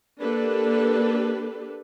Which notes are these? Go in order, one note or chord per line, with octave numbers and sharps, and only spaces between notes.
A#3 D4 G4 A4 B4